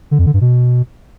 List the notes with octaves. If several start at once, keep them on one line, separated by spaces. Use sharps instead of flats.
D3
F2
D3
G2
B2